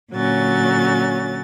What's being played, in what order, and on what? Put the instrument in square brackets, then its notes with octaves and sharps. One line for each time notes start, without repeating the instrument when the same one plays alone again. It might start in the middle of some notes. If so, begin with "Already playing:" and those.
[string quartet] A#2 D3 F#3 C#4 A6